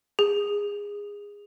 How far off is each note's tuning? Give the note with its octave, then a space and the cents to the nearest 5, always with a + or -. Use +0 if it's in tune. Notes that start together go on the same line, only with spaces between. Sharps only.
G#4 -20